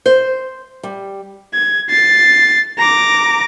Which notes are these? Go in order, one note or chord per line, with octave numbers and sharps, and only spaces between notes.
C5
G3
G#6
A6 C7
A#5 D6